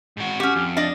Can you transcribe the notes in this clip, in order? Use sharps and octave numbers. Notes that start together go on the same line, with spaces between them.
G#2 F#4
C#4 F#4 G4
F2
D4 D5 D#5